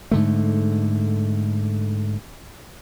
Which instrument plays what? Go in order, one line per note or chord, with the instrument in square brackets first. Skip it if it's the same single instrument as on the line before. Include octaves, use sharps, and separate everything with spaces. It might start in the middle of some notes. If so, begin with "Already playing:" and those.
[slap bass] G#2 D3 A3